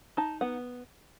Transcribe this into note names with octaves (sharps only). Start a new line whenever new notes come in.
D#4 A5
B3 F#5